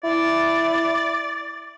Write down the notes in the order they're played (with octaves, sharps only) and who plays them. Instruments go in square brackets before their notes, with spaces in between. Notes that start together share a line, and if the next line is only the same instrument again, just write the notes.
[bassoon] E4 [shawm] D5